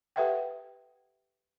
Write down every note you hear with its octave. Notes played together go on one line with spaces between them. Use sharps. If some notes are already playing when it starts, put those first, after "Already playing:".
G4 A4 B4 E5 F#5 G5